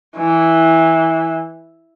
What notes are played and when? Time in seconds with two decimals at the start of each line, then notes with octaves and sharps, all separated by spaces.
0.17 E3